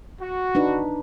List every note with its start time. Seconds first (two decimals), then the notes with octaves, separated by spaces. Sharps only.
0.20 F#4
0.55 D4 D#4 B4